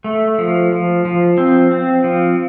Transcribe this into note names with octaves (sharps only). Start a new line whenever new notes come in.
A3
F3
F3
F3
C4
C4
F3